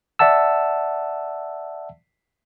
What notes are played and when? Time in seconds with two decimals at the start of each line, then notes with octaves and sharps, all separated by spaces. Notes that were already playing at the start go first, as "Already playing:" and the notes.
0.19 D5 E5 F#5 A5 E6